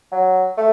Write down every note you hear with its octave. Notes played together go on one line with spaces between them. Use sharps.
F#3
A3